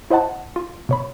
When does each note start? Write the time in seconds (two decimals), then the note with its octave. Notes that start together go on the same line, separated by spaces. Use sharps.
0.10 E4 C5 D#5 F#5 A5
0.56 F4
0.89 B2 C#5 B5